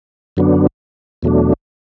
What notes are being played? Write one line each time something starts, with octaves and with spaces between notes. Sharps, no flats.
F#2 D3 F#3 B3 D4
E2 B2 F#3 A3 D4